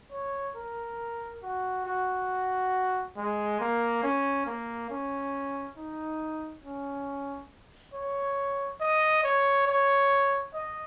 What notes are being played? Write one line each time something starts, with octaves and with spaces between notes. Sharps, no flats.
C#5
A#4
F#4
F#4
G#3
A#3
C#4
A#3
C#4
D#4
C#4
C#5
D#5
C#5
C#5
D#5